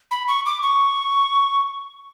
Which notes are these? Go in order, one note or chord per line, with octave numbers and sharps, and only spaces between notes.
B5
C#6
D6
C#6